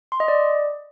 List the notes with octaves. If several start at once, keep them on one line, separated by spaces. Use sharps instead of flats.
C6
D#5
D5